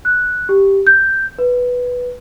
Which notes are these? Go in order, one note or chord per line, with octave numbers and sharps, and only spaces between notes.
F#6
G4
G6
B4